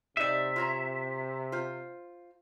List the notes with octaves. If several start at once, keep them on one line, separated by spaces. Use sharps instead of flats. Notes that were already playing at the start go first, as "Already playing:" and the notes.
C3 G3 D#4 D5 E5
F4 C#5 A#5
F4 C5